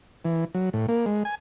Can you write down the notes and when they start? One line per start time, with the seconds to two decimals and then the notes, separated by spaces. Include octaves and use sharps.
0.25 E3
0.54 F#3
0.73 A2
0.88 A#3
1.06 G#3
1.25 G#5